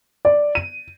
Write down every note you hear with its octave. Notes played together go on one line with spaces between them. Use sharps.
D5
D#7